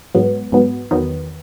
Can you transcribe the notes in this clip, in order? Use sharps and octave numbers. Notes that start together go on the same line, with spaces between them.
G#2 F#3 B3
G#2 F#3 B3
E2 D#3 F#3 B3